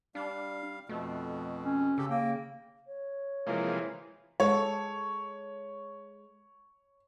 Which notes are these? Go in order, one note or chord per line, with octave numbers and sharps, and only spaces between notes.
G3 D4 F5
F2 B2 A3
C#4
C#3 G4 A4
A#3 G5
C#5
C3 E3 F3 G#3 A#3
G#3 A4 C#5